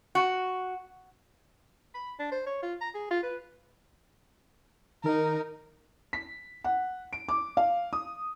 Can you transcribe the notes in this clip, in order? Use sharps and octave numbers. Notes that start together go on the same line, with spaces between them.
F#4
B5
D4
C5
C#5
F4
A#5
G#4
F4
B4
D#3 D#4 A#4
B6
F#5
D7
D6
F5
D#6